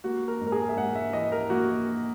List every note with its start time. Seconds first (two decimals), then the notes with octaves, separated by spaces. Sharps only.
0.04 A#3 F#4
0.28 A#4
0.41 G#2
0.47 A#4
0.52 G#4
0.69 E5
0.77 G#2 F#5
0.96 E5
1.13 E3 D#5
1.32 A#4
1.50 A#3 F#4